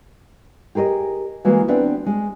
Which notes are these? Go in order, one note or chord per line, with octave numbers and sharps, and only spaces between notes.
G4 G#4 A#4 D5 D#5
E3 G#3 A#3 F#4
B3 C4 D4 E5
G#3